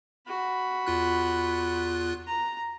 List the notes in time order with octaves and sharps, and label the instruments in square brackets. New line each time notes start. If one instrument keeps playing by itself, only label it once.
[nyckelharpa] F#4 B5
[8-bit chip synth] E2 F4 F#6
[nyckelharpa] A#5